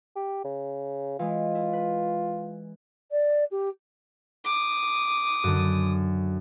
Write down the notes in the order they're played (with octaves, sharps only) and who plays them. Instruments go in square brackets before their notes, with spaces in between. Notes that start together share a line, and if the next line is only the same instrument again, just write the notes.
[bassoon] G4
C#3
[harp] E3 G#3 [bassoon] F4
[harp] E4
B4
[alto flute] D5
G4
[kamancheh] D6 D#6
[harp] F#2 D3